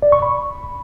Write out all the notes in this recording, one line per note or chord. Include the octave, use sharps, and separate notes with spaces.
D5
C#6
B5